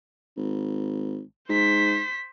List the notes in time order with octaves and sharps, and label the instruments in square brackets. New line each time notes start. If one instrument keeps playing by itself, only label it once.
[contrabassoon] G#1
[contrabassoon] G#2 [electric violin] C5 B6